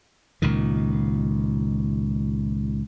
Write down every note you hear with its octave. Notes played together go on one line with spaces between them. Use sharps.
C#2 A#2 D#3